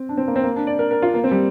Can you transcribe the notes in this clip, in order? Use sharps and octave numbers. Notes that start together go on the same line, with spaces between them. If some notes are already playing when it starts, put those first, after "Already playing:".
Already playing: C4
D4
C4
A#3
C4
A#3
D4
D5
A#4
A#4
F4
A#3
C4
G3